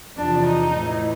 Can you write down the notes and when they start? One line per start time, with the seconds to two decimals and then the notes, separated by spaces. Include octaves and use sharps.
0.17 E2 C3 F3 D4
0.46 D#4
0.74 A2 E3